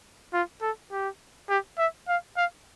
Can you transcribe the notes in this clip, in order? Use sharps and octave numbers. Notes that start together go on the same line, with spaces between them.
F4
A4
G4
G4
E5
F5
F5